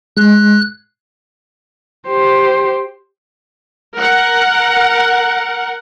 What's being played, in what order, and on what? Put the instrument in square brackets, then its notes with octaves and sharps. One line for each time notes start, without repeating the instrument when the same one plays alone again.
[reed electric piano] G#3 [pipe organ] F#6
[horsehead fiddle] G4 C5
[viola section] A#4 F#5